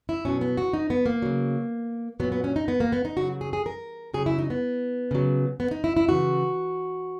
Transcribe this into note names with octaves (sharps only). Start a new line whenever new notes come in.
E4
B2 F#3 C#4
B3
F#4
D#4
B3
A#3
C#3 F#3
A#2 F#3 B3
B3
C#4
D#4
B3
A#3
B3
D#4
C#3 F#3 F#4
G#4
G#4
A#4
C#3 F#3 G#4
E4
D#4
B3
C#3 F#3
B3
D#4
E4
E4
C#3 E3 F#4